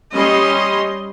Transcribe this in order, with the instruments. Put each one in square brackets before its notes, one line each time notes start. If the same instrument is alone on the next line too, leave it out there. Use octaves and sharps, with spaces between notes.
[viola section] G3 C#4 D#5 C6